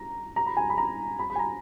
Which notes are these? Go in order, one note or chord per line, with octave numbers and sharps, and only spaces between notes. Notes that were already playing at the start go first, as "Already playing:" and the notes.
Already playing: A#5
A#5
B5
G#5
B5
A#5
B5
B5
G#5
A#5